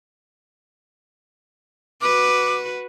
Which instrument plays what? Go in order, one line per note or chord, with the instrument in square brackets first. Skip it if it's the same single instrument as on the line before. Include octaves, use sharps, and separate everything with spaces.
[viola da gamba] F#4 B4 [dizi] D6